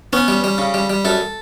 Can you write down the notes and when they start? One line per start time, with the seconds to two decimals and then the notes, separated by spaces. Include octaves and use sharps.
0.13 B3 C#4
0.28 G3
0.44 G3
0.58 C#3
0.74 G3
0.89 G3
1.05 F#2 A4